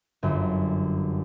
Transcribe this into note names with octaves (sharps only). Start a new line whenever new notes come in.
G1 F#2